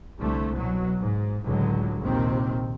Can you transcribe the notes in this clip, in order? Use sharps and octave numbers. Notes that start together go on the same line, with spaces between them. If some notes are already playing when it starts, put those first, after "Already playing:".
C2 D3 A3
B2 F#3
G#2
C#2 A2 D3 F#3 G#3
A#1 D#2 C3 D#3 C4